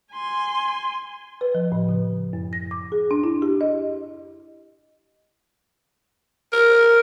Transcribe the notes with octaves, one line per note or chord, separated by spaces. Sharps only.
G#5 C6
B4
F3
A2
C#3
F#2
A#6
D6
G#4
D4
E4
G4
D#5
A#4